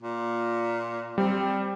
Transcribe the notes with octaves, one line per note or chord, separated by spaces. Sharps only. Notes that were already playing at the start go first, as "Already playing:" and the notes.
A#2
G3 C4